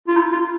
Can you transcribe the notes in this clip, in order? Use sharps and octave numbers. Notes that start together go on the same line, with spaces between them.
F4
E4
F4